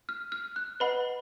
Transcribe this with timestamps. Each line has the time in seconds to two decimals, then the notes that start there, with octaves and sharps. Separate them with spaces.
0.09 F6
0.32 F6
0.56 F#6
0.80 B4 D#5 F#5 B5